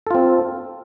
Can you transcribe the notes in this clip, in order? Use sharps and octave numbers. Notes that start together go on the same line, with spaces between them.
C4 F4 A4